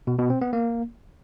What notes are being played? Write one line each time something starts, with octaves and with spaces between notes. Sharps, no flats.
B2
B2
C4
B3
A#3